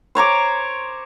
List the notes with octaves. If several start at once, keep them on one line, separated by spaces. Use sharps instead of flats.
C5 C#5 A#5 D6